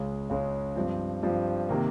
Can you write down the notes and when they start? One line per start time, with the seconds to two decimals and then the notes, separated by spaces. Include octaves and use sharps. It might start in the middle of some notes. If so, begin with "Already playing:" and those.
Already playing: C#2 C#3 G#3 C#4
0.30 C#2 C#3 G#3 C#4
0.75 G2 F3 C4
1.23 G2 F3 C4
1.69 C3 D#3 A#3